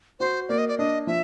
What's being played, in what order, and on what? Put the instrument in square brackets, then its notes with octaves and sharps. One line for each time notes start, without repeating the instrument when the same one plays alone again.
[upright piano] F#4 [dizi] C5
[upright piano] A#3 [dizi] D5
[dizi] D#5
D5
[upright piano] D4 [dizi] D#5
[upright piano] F3 [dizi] E5